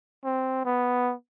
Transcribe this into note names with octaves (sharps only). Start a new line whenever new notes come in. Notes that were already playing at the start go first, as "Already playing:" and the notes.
C4
B3